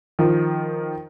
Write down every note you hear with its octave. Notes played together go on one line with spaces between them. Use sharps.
D#3 F3